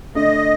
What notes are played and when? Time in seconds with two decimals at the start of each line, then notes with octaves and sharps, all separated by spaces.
0.15 D3 A3 D4 D#5